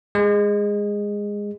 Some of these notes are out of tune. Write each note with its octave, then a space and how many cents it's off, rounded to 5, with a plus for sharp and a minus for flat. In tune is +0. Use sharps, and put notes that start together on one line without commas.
G#3 -15